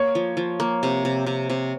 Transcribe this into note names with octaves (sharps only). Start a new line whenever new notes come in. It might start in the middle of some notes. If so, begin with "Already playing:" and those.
Already playing: A#3 C#5
F3
F3
A#3
C3
C3
C3
C3